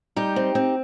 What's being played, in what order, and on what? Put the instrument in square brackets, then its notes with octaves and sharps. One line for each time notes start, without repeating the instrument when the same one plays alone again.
[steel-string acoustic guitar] G3 D#4 G4
C4
C4